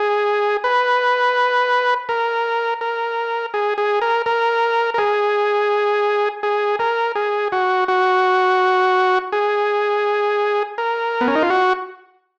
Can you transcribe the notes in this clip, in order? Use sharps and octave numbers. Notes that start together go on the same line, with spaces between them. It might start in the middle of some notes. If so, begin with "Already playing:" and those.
Already playing: G#4
B4
A#4
A#4
G#4
G#4
A#4
A#4
A#4
G#4
G#4
A#4
G#4
F#4
F#4
G#4
A#4
B3
C#4
D#4
F4
F#4